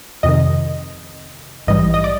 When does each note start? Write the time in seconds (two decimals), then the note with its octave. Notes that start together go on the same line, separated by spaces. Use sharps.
0.23 F2 C3 D#3 D#5
1.67 A#1 G#2 E3 G3 D#5
1.94 D#5
2.04 D5